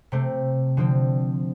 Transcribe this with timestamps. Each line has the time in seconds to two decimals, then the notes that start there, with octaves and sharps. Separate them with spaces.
0.12 C3 A3 C4
0.77 D3 F3 C4